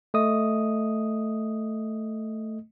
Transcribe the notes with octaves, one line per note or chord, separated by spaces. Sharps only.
A3 D#5 D#6